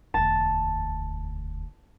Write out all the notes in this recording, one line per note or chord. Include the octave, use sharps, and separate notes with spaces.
E1 D2 A5